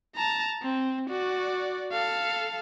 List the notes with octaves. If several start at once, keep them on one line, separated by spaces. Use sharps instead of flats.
A5 A#5
C4
F#4 D5
A4 F5